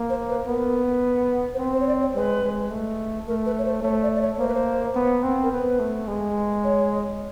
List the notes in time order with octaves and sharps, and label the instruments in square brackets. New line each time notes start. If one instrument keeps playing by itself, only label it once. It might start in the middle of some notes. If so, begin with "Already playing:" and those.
Already playing: [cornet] A#3
[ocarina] C5
B4
[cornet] B3 [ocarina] A#4
[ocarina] C5
[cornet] C4 [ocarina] B4
[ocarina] C5
C#5
D5
C#5
[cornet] G#3 [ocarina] B4
[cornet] G#3
A3
[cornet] A3 [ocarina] A#4
[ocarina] B4
C#5
C5
[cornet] A3 [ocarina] C#5
[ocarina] D5
D5
C#5
[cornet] A#3 [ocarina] C5
[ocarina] B4
C5
[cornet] B3
C4
[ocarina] A#4
[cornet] B3 [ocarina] B4
[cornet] A3
G#3
[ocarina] C#5